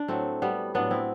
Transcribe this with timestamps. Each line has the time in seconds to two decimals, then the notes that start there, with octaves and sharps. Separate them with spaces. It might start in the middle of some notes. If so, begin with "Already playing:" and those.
Already playing: D4
0.08 A2 F#3 A3 C4
0.42 G3 B3
0.74 A2 F#3 B3 D4
0.91 C4 E4